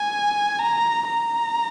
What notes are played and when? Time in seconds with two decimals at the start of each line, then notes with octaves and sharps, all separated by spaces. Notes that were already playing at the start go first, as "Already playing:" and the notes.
Already playing: G#5
0.59 A#5
1.08 A#5